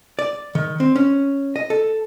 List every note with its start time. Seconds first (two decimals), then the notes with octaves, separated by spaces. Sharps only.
0.19 D5
0.55 D#3
0.80 C4
0.96 C#4
1.56 D#5
1.70 A4